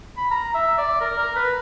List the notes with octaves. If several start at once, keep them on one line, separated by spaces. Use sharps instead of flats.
B5
A#5
E5
D5
A#4
A#4
B4